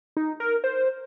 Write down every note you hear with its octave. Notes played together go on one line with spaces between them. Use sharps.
D#4
A#4
C5